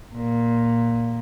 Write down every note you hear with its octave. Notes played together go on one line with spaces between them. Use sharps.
A#2